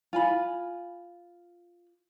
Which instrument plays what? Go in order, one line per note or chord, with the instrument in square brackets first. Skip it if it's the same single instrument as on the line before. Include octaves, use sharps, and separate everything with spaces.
[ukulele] F4 G#5 B5